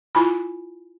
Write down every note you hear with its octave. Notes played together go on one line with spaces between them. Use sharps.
E4 F4 G#5 B5